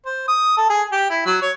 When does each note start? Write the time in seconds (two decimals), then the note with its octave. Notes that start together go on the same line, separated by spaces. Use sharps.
0.06 C5
0.28 D#6
0.57 A4
0.69 G#4
0.92 G4
1.10 E4
1.26 F#3
1.42 C#5